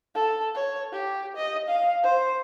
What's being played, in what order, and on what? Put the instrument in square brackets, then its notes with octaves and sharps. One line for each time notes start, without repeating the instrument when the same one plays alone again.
[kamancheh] A4
C#5
G4
D#5
F5
C5